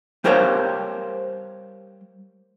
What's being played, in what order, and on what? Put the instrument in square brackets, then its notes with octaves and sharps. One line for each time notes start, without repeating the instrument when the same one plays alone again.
[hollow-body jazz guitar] G3 G4 A#4 C5 C#5 F5